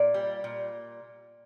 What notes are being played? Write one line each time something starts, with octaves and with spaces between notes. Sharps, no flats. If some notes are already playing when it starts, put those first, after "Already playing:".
Already playing: A#2 D5
G3
A#2